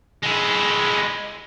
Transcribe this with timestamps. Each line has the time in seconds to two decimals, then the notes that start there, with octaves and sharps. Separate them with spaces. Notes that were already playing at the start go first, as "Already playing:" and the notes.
0.23 G#3 E4